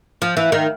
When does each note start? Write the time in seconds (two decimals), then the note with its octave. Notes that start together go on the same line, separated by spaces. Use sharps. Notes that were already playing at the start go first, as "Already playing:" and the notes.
0.22 F3
0.37 E3
0.52 D#3